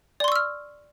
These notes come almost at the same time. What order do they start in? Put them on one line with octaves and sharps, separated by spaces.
D5 C6 C#6 E6 F6